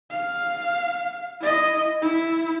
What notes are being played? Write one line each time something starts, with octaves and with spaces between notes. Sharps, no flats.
F5
E4 D#5
E4